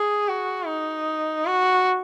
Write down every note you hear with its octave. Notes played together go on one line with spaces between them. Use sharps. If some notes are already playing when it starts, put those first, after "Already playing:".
Already playing: G#4
F#4
D#4
F#4